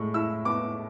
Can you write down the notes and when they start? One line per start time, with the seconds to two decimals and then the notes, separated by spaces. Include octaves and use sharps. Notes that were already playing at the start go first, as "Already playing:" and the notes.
Already playing: A2 G#3 C#6
0.14 E4 E6
0.45 B3 D6